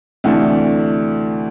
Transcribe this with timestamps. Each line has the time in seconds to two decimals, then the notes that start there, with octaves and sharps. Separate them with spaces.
0.24 D2 C3 E3 A3 D4